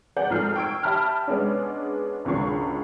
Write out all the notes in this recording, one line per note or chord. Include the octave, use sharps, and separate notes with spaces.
G#4 B4 D5 F#5 G6
G#1 G#2 F3 A3 F6 C7
G5 C#6 E6 G#6 D7
G4 E5 G5 A5 B5 F6
G#3 B3 C#4 D4
G#1 C#2 D3 F3 C#6 C7